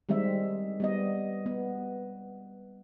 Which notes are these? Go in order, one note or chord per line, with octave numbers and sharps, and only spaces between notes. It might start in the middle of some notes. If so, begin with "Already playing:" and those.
D#3 G3 G#3 C4 E5
G3 B3 D#5
B3